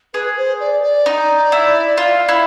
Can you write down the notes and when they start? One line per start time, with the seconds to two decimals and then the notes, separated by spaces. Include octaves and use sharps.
0.14 G#4 B4
0.37 C5
0.60 D5
0.83 D5
1.06 D#4
1.52 E4
1.97 F4
2.29 E4